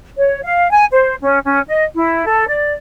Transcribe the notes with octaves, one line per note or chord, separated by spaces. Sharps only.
C#5
F5
G#5
C5
C#4
C#4
D#5
E4
A4
D5